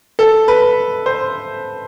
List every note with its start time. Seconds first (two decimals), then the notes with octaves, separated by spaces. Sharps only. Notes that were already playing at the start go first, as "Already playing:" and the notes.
0.19 A4
0.48 B4
1.06 C5